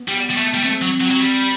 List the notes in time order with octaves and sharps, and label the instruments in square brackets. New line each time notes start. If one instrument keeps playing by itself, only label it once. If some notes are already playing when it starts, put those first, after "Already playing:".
Already playing: [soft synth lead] B3
[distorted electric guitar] G3
G3
A3
G3
[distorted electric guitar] A3 [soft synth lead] C4
[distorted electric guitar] F#3
F#3
F#3
G3